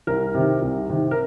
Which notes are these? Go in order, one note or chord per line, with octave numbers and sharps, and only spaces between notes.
C2 A#4
C3 D#3
C2
C3 D#3
A#4